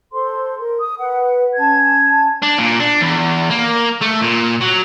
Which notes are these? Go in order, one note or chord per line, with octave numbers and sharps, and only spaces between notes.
A4 C5 C6
A#4
D#6
B4 F#5
C#4 A5 G#6
D4
A#2
D4
E2
A#3
A3
A#2
F#3